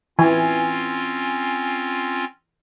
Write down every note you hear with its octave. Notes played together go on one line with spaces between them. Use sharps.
E3 C4 C#4 F4 G#5